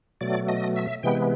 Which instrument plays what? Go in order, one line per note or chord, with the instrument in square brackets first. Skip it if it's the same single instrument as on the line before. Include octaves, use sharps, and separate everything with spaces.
[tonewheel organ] B2 F#3 A3 D5
D#5
E5
C3 E3 G#3 B3 G5